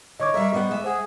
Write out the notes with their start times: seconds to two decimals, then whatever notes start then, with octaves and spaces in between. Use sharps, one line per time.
0.20 D3 C#5 D#5 C#6 D6
0.34 G3 A#4 E5
0.54 G3 B3 C5 F#5
0.71 G#3 E5
0.84 G#4 C5 F#5